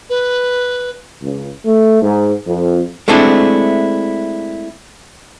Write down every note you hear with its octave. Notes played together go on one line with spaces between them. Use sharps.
B4
C#2
A3
G#2
F2
G#3 A3 C4 D4 E4